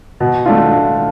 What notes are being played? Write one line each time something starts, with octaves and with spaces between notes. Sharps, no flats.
B2
A3 D4 F4